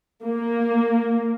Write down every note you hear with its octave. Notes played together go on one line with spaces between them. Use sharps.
A#3